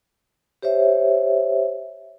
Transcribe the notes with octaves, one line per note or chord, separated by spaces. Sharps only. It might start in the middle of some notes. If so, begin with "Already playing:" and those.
G4 C5 C#5 E5